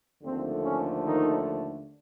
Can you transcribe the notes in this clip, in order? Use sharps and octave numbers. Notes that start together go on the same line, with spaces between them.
D#2 D3 F3 A3 C4
C#4
D#3 D#4